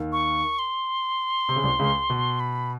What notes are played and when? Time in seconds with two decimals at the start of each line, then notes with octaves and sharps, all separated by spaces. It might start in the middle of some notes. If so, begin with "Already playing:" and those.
Already playing: D#2 D#3
0.12 C#6
0.59 C6
1.49 C3
1.56 C#3
1.64 C2 C3
1.79 C#2 C#3
2.10 B2
2.40 B5